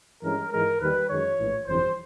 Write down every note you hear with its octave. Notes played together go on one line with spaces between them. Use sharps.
G2 E3 G#3 C#4 A#4
G#2 E3 G#3 A#4
D#2 D#3 G3 B4
F#2 D#3 G#3 C#5
A#1 A2 E3
G1 F2 C3 E3 C5